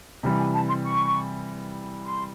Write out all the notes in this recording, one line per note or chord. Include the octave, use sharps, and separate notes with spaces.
C3 E3 G3 D5
G#5
A5
C6
C#6
C6